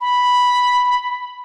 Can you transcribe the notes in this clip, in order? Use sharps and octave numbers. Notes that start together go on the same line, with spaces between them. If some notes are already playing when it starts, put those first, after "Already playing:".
B5